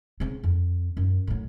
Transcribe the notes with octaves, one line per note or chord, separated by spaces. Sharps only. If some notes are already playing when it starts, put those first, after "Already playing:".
C#3 C4
F2
F#2
A2 F#3